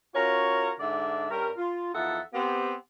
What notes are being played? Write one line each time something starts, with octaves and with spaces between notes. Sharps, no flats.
C#4 F4 F#4 A#4 C#5
G#2 D3 D4 D5 E5
G2 G3 C#4 A#4
F4
E2 F3 D#4 A4 E5 F#5
B3 C4 G4